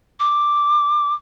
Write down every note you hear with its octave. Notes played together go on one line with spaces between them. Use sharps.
D6